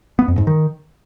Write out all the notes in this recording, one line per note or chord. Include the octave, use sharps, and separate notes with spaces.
B3
F2
G#2
D#3